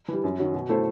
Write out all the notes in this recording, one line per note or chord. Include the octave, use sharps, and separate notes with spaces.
E3 G3
F#2
D#3 F#3
B2
A3 E4 A4 C5